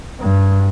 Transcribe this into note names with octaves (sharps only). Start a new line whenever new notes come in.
G2